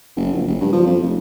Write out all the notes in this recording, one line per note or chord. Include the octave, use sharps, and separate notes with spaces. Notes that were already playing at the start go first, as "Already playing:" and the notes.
F#1
A#1
F#1
G2
F3
F2
F1